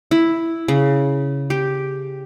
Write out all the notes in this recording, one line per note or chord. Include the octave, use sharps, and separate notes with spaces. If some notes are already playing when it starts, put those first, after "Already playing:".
E4
C#3
G4